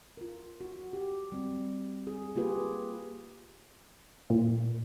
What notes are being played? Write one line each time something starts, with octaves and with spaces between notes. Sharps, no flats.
F4 A#4
F#4
G4
G3 C4
G#4
A#3 F4 G4 G#4 B4
A#2